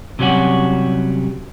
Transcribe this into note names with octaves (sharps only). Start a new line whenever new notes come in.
C3 F#3 G3 C#4 F#4